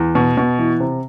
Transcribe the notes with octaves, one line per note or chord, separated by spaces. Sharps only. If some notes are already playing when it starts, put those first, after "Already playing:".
Already playing: E2
B2
B2
E3
C3